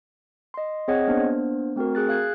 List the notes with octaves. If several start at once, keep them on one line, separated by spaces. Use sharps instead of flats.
D#5 C6
C4 G#4 C#5 D#5 F#5 G#6
A#3 B3 D4 C5 D5
A3 C4 F#4 A#4
G#4 F#6 A6
F5 F#6 G#6